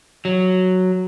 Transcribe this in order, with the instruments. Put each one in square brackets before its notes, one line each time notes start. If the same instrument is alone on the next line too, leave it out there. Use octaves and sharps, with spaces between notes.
[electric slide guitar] F#3